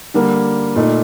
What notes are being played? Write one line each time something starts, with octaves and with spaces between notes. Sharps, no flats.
D3 G3 A#3
A#2 A3 D#4